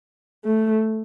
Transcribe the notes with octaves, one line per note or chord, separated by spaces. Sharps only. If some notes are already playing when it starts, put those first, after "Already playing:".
A3